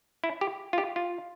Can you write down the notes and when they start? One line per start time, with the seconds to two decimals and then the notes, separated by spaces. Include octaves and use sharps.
0.24 E4
0.41 G4
0.73 F4
0.78 G4
0.96 F4